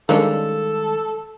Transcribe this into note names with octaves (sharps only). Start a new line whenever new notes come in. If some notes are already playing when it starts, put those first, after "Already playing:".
D#3 G3 G#3 A#3 C#4 D4 A4